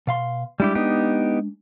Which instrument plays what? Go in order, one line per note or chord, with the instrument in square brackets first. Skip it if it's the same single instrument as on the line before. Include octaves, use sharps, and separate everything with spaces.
[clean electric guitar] B2 F5 C6
[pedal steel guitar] G3 E4 G4 [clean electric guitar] G#3 D4
[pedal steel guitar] B3 D#4 G4